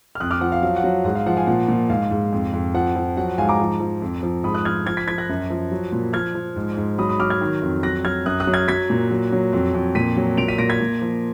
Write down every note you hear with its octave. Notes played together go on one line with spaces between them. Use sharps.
F6
F2 D#6 F#6
D6 F6
F3 F#5
F5
F#3 F5
F#5
F#3
G#2 F#5
F5
F3 F#5
F5 G#5
A#2 F#5
A#2
G#2 F5
G#2
F2
F2
F3 F#5
F3
F#3 F#5
F#5
G#2 F5 G#5
A#5 D6
F3
F3
F2
F3
G#2 B5 D#6
D#6 F#6
F3 F6 G#6
F3 F6 G#6
G#6 B6
F3 G#6 B6
F#6 A#6
F#2
F3
F#3
A#2
F3 F6 G#6
F3
G#2
G#2
F#3 B5 D#6
B5 D#6
F#3 D6 F6
F6 G#6
D#3
F2
F#3 F#6 A#6
F#3 F6 G#6
F#2 D#6 F#6
D#6 F#6
F#3
F6 G#6
F#3 G#6 B6
A#2
F#3
F#3
F2
F2
A#2 B6 D#7
F#3
A#2 D7 F7
B6 D#7
A#2 A#6 D7
G#6 B6
A#2
F3